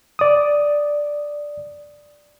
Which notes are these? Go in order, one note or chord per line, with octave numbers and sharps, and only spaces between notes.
D5 D#6